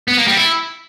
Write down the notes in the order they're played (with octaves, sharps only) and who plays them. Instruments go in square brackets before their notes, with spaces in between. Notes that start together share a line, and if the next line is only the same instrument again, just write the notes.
[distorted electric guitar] B3
A#3
G3
E4